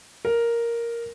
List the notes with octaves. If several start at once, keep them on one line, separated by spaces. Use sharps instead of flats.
A#4